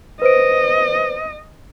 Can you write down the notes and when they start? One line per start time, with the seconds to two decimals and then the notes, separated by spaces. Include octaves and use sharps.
0.22 B4 C5 D#5 D7